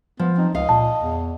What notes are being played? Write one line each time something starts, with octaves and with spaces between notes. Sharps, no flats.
F3 B3
C4 D#4
C#2 D#5 F5
A#2 A5
E2